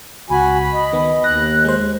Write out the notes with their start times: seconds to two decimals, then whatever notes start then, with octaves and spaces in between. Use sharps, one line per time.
0.30 C#2 F#4 G#5 B5
0.73 D#5
0.93 D#3 B3
1.24 D#2 F#6 A#6
1.65 G#3 C5